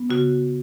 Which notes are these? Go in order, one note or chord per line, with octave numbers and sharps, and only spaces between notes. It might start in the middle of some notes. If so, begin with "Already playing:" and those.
Already playing: B3
C#3 F#4